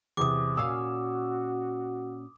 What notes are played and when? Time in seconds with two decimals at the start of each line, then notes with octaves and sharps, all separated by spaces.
0.17 E2 C3 D6 D#6
0.57 A#2 C#4 F#4 F5 E6